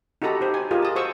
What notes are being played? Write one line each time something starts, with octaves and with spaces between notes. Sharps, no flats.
D#4 F#4 G4 A4 A#5 B5
G4 C5
G#5
F4 G4 G#4 A#4 D#5
A5 D#6
F#4 G#4 C5 C#6 D#6 E6